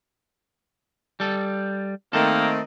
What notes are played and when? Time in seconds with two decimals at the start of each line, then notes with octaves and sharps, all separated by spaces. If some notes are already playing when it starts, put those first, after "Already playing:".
1.20 G3 A4
2.13 D#3 A3 A#3 C4 A4